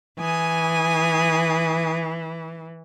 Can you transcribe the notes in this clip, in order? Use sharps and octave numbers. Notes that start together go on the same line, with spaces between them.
E3 G#5 D#6